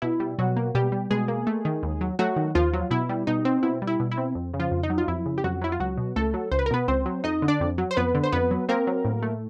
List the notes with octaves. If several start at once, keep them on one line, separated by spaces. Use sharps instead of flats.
B2 E4
G3
B2 F#3 F#4
A#3
B2 G3 G4
G3
B2 G#3 G#4
A#3
A3
D#3
D#2
F#3
F#3 A3 F#4
D#3
D#2 F3 F4
F#3
B2 E4
G3
B2 D#4
C4
B2 E4
G3
E4
B2
E4
C4
F2
C#3
F3 F4
F2
D#4
F#3
F4
F2 E4
C#3
G4
F2 F#3 F#4
F#3 E4
F4
C#2 F#3 F#4
B2
C#2 A3 A4
F#3
C#2 C5
B4
A#4
B2 B3 B4
C#2 C4 C5
F#3
F2 D#4 D#5
D3
D4 D5
F2
F#3
C5
F2 B3 B4
D3
C5
F2 B3 B4
F#3
A#3 C4 A#4
F#3
A2
A3